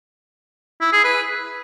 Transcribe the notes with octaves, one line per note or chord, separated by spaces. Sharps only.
E4
G#4
B4